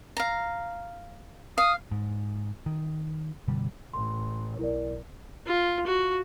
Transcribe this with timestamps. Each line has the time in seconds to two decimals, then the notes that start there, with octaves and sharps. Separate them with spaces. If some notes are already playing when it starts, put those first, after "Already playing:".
0.17 F5 A#5
1.58 F5 D#6
1.91 G#2
2.66 D#3
3.48 F#1 B2 D3 G3
3.94 A1 C6
4.59 B1 E4 A#4 D5
5.47 F4
5.87 F#4